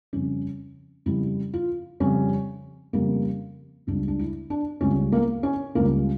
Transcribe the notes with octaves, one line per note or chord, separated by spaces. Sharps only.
F2 C#3 G3 C#4
F2 C#3 G3 E4
F4
F2 C#3 G3 C#4
F2 C#3 G3 A#3
C#2 C#3 G3 D4
D4
E4
D4
C#2 C#3 G3 C#4
A#3
C#4
C#2 C#3 G3 A#3